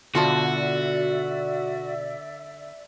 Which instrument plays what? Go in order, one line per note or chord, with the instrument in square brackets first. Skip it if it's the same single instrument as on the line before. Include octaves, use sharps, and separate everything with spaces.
[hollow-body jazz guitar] B2 F4 A5 [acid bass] D3 [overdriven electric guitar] F#4 [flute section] D5 E5